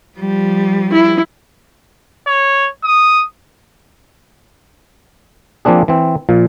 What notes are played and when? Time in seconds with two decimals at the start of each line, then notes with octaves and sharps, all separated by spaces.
0.18 F3 G3
0.91 E4
2.27 C#5
2.84 D#6
5.65 F3 A#3 C4 D4 G#4
5.88 E3 C4
6.29 A#2 F3